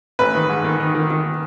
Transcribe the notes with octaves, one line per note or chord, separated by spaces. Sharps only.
A1 B4
D#3
G#2
D#3
D#3
D#3
D#3